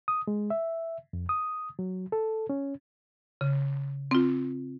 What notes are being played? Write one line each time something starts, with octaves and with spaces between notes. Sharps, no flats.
D#6
G#3
E5
F2
D#6
F#3
A4
C#4
C#3
C4 F4